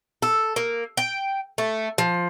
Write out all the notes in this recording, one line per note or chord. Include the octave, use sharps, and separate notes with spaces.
A4
A#3
G5
A3
F3